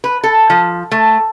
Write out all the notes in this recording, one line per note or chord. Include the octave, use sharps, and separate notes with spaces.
B4
A4
F3
A3